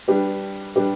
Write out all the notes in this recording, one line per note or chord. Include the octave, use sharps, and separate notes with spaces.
G3 D4 G4 B4
G3 D4 G4 B4